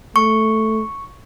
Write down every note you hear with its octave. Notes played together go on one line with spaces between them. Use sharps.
A3 C#6